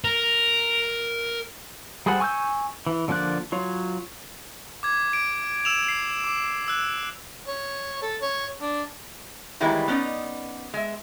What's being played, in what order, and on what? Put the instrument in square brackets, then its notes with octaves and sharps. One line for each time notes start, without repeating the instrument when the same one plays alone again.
[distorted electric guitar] A#4
[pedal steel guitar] G3 G#4 A4 C5 F#5
G#5 C#6 E6 F6 G6
E3
D3 F3 A#3 D4 F#6
F#3 F4 C#5
[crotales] D6 G#6
D7
E6 E7 F7
C7
D6
E6 F#6
[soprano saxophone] C#5
A4
C#5
D4
[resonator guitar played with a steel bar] D#3 E3 G3 G#3 A#3 E4
B3 C#4 D#4 D5 D#5
G#3 E5